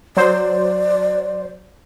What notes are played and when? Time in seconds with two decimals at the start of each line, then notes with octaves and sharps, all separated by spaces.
0.17 F#3 C5 D5